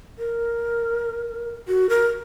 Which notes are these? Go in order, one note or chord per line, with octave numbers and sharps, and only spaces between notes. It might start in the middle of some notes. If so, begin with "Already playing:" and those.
A#4
F#4
A#4